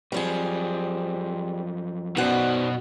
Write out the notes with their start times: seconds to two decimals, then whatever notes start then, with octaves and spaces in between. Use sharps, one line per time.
0.12 F#2 F3 G3 C4 G#4
2.17 F#2 B2 D#4 C5 D5 F#5